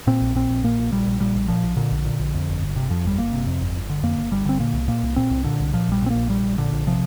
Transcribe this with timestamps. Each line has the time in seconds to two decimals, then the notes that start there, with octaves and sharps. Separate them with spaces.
0.07 A#2 C4
0.21 A#1
0.35 A#2 C4
0.50 A#1
0.64 A#2 A#3
0.79 A#1
0.92 A#2 G3
1.07 A#1
1.20 A#2 G3
1.35 A#1
1.48 A#2 F3
1.63 A#1
1.77 A#2 D3
1.91 A#1
2.05 A#2
2.19 A#1
2.34 F2
2.48 G1
2.62 G1
2.76 C3
2.90 F2 F3
3.04 G1 G3
3.18 G1 A#3
3.32 C3
3.47 F2
3.61 G1
3.76 G1
3.89 D3
4.03 F2 A#3
4.17 G1
4.31 G1 G3
4.45 D3 C4
4.60 A#2 A#3
4.74 C2
4.88 A#2 A#3
5.03 C2
5.16 A#2 C4
5.30 C2
5.44 A#2 D3
5.60 C2
5.73 A#2 F3
5.88 A#1 G3
6.02 A#2 C4
6.10 A#1 A#3
6.29 A#2 G3
6.44 A#1
6.58 A#2 D3
6.72 A#1
6.87 C3 F3